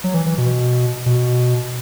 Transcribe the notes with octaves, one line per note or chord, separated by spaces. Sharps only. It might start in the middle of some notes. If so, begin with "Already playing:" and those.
F#3
E3
E3
B2
B2